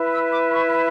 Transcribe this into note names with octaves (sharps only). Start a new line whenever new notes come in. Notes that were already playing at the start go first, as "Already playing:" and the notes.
Already playing: E4 B4
E6
D6
C#6